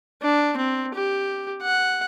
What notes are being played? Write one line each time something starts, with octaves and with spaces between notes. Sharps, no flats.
D4
C4
G4
F#5